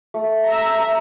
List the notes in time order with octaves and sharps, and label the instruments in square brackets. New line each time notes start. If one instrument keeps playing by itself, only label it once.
[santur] A3
[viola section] E5 A#5